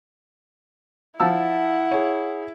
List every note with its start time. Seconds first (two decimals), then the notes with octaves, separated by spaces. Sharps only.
1.20 F3 E4 F#5 A5 E6
1.91 G#4 C#5